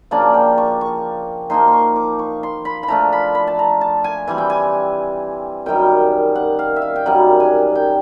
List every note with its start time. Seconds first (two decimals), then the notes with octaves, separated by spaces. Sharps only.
0.11 C#3 F3 A#3 D4 D5
0.34 G5
0.58 C#6
0.81 C#6
1.50 F3 A#3 D#4 C6
1.68 C6
1.73 C#6
1.96 D6
2.19 C#6
2.43 C6
2.65 B5
2.83 B5
2.88 F3 A3 D4 F4 A#5
3.13 B5
3.35 B5
3.47 A5
3.59 A#5
3.81 A5
4.04 G#5
4.27 E3 G3 C4 G#5
4.38 G5
4.50 G#5
5.66 F#2 D#3 G3 G5
6.35 F#5
6.59 F5
6.76 E5
6.82 F5
6.96 G5
7.06 F#2 D#3 G3 F#5
7.40 G#5
7.75 G5